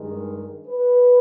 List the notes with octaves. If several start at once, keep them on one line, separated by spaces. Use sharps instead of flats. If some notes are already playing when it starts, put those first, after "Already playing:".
Already playing: G2 D#3 G#3
B4